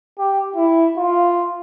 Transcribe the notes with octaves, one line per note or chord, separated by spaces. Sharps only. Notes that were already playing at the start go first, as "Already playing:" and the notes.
G4
E4
F4